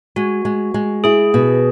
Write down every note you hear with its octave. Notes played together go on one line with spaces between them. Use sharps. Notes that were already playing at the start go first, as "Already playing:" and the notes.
G#3 F#4
G#3
G#3
E4 G#4
B2